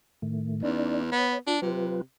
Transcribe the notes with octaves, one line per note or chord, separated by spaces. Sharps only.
A2 D#3 A3
E2 C#4 D#4 D5
B3 C#5
D4 F4
C3 F#3 F4 B4